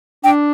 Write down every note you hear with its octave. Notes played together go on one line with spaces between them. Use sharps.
D4 G5